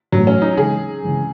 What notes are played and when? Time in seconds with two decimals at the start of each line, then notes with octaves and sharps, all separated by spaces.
0.12 A2 E3 F#3 A3
0.27 C#4
0.42 D#4
0.57 C#3 E3 G#3 G#4
1.03 C#3 E3 G#3